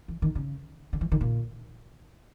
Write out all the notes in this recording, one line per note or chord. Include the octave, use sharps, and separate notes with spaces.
E3
D#3
C#3
D3
E3
D#3
A#2